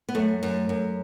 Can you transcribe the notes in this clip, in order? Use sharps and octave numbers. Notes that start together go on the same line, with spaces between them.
B3
F#2 A3
F#2
F#2